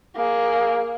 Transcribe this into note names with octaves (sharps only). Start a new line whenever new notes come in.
A#3 G#4